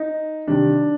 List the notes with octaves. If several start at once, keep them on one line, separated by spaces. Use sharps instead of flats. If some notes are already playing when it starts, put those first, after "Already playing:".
Already playing: D#4
C3 D#3 G3 D4